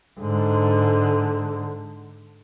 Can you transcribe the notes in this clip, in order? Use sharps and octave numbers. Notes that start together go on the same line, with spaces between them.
G#2 D3